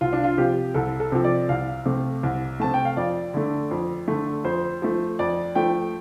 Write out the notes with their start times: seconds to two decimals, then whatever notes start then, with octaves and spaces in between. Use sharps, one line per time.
0.01 C2 F4
0.13 D4
0.24 F4
0.38 C3 F3 G4
0.74 C2 A4
1.00 A4
1.12 C3 F3
1.24 D5
1.49 C2 F5
1.86 C3 A3
2.23 C2
2.60 C3 A3 A5
2.74 G5
2.85 F5
2.97 F2 D5
3.34 D3 A3
3.71 F2
4.08 D3 A3
4.44 F2 C5
4.82 F3 A3
5.19 F2 D5
5.55 F3 A3 G5